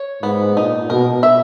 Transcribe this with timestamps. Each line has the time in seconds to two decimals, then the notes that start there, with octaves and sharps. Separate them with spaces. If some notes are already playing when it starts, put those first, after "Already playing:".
Already playing: C#5
0.23 G#2 B3
0.56 A#2 D#4
0.90 B2 A#4
1.23 E5